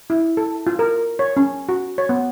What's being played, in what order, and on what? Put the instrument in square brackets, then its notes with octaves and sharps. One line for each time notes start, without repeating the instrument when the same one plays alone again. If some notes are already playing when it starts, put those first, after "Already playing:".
[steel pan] E4
A4
F4
A#4
C#5
C#4
F#4
C#5
B3